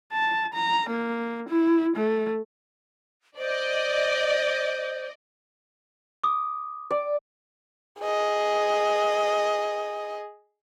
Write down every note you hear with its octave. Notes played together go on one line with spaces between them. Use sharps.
A5
A#5
A#3
E4
A3
C5 D5 D#5
D6 D#6
D5
G#4 D#5